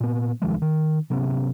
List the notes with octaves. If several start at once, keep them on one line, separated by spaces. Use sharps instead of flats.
A#2 B3
C2 D#3 F3 G#3
D#3
C3 F#3 B3 C#4